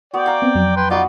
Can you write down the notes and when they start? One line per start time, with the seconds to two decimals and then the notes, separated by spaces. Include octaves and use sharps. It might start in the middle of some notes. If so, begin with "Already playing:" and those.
0.14 B3 F#4 D5 G5
0.26 F5 A#5 D6
0.42 B3 C4
0.55 F2 F#3
0.76 B4 G5 C6
0.90 B3 D#4 F4 F#4 B4 D5